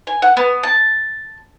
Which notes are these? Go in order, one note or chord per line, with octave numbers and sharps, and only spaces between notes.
G#5
F#5
B3
A5